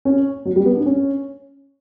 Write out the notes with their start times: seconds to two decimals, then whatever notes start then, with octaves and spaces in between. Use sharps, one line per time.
0.05 C#4
0.45 F#3
0.56 G3
0.65 B3
0.77 D4
0.86 C#4